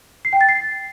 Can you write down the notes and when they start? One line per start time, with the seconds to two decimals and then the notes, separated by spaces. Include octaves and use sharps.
0.25 C7
0.33 G5
0.41 A6
0.49 C7